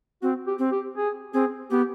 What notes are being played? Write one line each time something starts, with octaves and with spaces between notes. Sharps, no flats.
C4 F#4
G4
C4
G4
G#4
C4 G#4
B3 G4